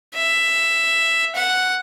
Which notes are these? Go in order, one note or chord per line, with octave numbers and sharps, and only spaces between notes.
E5
F#5